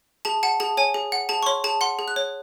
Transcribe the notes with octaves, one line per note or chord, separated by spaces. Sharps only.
G#4 A5
F#5 A5
G#4 A5
C#5 G#5
G#4
F#5
G#4 A5
C#6
C#5 C6
G#4 A5
F#5 C6
G#4
F#6
C#5